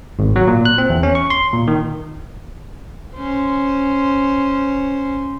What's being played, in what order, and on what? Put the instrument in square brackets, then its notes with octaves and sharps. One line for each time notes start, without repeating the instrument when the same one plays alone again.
[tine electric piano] G#1
F#3
A#2
F#6
C4
E2
C#4
C#6
C6
A#2
D#3
[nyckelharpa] C#4 C5